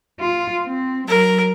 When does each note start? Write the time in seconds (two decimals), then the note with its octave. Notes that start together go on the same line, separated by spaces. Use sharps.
0.20 F4
0.67 C4
1.08 F#3 A#4